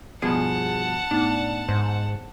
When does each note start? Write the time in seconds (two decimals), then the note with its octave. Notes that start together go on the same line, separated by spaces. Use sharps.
0.22 G2 B2 F3 G#4 F#5 A5
1.11 A2 B3 D4 D#4
1.69 G#2 C5